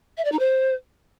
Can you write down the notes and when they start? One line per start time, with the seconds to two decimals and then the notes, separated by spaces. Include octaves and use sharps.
0.17 E5
0.24 D5
0.32 D#4
0.39 C5